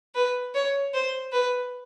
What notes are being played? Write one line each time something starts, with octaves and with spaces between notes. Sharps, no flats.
B4
C#5
C5
B4